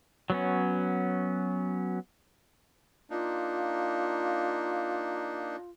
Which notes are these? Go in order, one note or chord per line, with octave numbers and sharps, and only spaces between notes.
F#3 B3 C#4
A#3 D4 D#4 F4